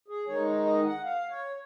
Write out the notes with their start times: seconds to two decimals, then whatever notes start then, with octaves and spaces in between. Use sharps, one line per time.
0.08 G#4
0.27 D#3 G#3 D#4 C#5
0.65 D#5
0.85 F#5
1.04 F5
1.29 C#5